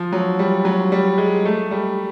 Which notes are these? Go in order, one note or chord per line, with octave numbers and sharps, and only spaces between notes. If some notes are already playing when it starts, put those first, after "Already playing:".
Already playing: F3
F#3
G3
F#3
G3
G#3
A3
G3